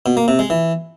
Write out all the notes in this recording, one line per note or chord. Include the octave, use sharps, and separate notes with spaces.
B2
A#3
C3
G#3
E3